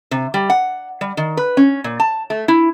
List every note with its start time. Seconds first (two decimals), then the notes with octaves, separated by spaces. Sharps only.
0.11 C3
0.34 G3
0.50 F#5
1.01 G3
1.17 D#3
1.37 B4
1.57 C#4
1.84 A#2
2.00 A5
2.30 A3
2.48 E4